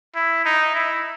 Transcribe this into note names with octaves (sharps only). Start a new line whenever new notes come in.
E4
D#4
E4